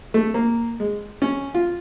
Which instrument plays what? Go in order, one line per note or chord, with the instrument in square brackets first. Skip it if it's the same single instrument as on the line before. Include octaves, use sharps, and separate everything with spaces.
[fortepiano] A3
A#3
G#3
C#4
F4